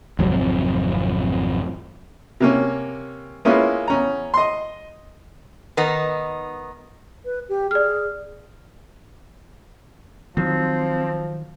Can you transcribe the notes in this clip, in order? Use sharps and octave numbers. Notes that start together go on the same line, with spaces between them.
G#1 F2 C3 F#3
C3 A#3 C#4
G#3 A#3 B3 C#4 E4 F4
E2 C#4 A#5
D#5 C6
D#3 B3 D#4
B4
G4
G#4 D5 F6
D#3 F3 F#3 C4